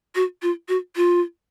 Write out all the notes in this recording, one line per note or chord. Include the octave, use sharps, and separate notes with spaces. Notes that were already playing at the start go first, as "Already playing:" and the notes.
F#4
F4
F#4
F4